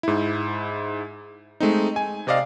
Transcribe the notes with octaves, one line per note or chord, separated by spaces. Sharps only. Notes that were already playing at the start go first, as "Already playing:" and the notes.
G#2 E4
G#3 A3 C4 D#4
G#5
C3 C4 D5 D#5 F5 C7